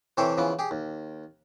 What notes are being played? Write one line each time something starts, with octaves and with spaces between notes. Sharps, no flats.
C3 E3 G4 A4 C5 C#5
C#3 E3 F3 B3
G4 G#4
D#2